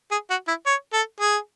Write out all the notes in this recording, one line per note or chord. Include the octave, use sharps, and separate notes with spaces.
G#4
F#4
E4
C#5
A4
G#4